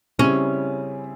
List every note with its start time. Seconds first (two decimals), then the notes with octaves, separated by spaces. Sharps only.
0.19 C#3 G3 C4 C#4 E4 G#4